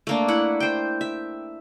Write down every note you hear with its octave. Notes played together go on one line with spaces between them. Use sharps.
A3 A#3 D4
E4 F#5
C5 G5
E5